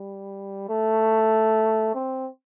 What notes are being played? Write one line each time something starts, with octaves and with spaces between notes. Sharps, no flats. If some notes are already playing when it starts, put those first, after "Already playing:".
Already playing: G3
A3
C4